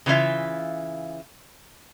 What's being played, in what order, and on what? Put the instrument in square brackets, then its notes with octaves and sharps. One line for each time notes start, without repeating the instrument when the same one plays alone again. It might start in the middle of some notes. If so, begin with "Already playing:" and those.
[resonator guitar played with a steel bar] C#3 E3 G#3 F4 E5